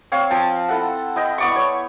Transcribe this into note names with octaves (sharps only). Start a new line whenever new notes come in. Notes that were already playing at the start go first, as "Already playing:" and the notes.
C4 C#5 F5
F3 C4 A5
E4 A4 F#5
E4 D#5 G5
B3 D5 C#6
C#5